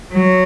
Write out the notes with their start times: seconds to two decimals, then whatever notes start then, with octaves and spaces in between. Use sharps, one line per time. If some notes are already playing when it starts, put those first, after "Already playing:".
0.13 F#3